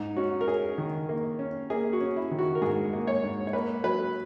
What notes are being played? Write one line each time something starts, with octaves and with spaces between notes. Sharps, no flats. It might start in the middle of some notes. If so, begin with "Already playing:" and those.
Already playing: G#2 D#4
C#4 F#4
A#4
C#4 G#4
D#3
A#3
C#4
A#3 G#4
F#4
C#4
E4
D#3
F#4
A#4
G#2 G#4
A#3
C#5
G#2
C#5
A#3 B4
F#3 B4